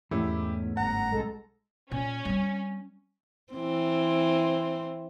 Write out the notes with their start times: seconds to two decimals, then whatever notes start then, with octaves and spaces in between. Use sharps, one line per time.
0.11 E2 G#2 A3 C#4 E4 G4
0.77 G1 F#5 A#5
1.11 B1 G#3 A4
1.91 A#2 C#4
2.25 G3 C4
3.53 E3 C4